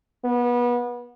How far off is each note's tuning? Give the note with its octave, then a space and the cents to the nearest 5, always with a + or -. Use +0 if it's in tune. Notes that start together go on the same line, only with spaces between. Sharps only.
B3 -25